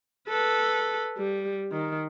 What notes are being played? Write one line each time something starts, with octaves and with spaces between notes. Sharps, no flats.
A4 B4
G3
D#3